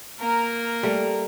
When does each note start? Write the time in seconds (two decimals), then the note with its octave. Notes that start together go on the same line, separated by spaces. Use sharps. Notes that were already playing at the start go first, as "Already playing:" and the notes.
0.20 A#3 A#4
0.83 G3 A3